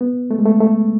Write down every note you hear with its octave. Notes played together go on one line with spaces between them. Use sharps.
B3
A3
G#3
A3
A3